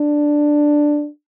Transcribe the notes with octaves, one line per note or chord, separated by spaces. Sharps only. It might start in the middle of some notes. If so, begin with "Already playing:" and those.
Already playing: D4